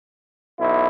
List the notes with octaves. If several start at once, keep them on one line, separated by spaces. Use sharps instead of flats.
B1 E4